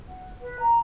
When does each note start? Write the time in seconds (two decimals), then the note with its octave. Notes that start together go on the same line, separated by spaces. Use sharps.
0.08 F#5
0.41 B4
0.59 A#5